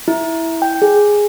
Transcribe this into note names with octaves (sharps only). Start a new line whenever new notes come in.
E4
G5
G#4